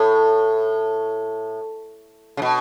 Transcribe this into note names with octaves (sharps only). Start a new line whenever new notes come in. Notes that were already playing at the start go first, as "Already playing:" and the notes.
Already playing: A2
C#3
B2